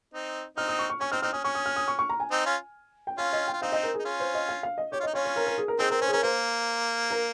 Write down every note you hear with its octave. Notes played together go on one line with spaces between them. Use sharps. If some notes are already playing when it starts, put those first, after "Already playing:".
C4 D#4
C4 D#4 F6
D#6
C#6
C#6
C#4 C#6
C4 D#4 F6
C4 D#4 F6
C#4 D#6
C#4 C#6
D#6
F6
D#6
C#6
C#6
A#5
G#5
C4 D#4
C#4 F4
G5
C#4 F4 F5
D#5
G5
F4
C4 D#4 F5
D#5
A#4
G#4
D#4
C#4 F4
C5
D#5
F5
F5
D#5
G4 C#5
F4
D#4 D#5
C#4 F4 C#5
C#5
A#4
A#4
G#4
A#4
C4 D#4 G#4
C4 A#4
C#4 C5
G#4
C#4 A#4
A#3 C5
A#4